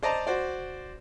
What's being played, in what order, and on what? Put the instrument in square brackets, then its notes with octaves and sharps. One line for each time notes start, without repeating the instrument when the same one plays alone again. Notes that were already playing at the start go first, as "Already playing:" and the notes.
[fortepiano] C5 D5 D#5 A5 A#5
F#4 C5 D5